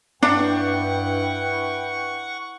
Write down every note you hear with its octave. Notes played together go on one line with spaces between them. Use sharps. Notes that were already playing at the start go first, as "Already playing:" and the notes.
G2 D4 E4 B4 F#5 G5 C#6